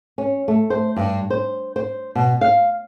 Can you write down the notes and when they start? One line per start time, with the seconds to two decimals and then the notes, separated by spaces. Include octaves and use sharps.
0.18 C#4
0.48 A3
0.70 C5
0.96 G2
1.30 C5
1.76 C5
2.15 B2
2.41 F5